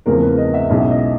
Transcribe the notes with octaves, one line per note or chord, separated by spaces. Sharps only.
E2 C#3 F3 A3 C4 A#4
B4
D#5
E5
B1 B2 G#3 C#4 E4
E5
D#5